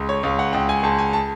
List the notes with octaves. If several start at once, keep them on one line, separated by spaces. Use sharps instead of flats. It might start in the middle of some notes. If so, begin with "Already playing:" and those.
Already playing: C#2
C#5
C#2 F5
F#5
C#2 G5
G#5
C#2 A5
G#5
A5